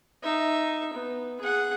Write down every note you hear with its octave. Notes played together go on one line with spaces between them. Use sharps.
D#4 E5
B3
G#4 F#5